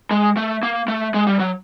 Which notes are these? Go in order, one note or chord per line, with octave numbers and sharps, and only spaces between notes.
G#3
A3
A#3
A3
G#3
G3
F#3